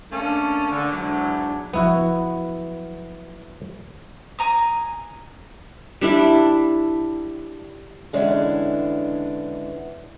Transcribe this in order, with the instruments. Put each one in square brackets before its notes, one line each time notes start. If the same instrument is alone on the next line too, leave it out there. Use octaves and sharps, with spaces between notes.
[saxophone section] A3 A#3 C#4 [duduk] D4
[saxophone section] D3
[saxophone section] E2 G#2 F#3 [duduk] D4
[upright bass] F3 F#3 [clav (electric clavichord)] B3 E4 F#4
[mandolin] G#5 A#5 D#6
[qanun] G3 D4 E4
[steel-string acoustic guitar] D3 E3 G#3 B3 C#4 D4